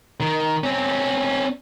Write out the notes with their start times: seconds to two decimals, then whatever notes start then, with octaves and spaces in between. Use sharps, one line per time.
0.20 D#3
0.64 C4 C#4